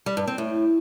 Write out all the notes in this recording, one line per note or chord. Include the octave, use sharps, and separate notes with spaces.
G3
G2
C4
A2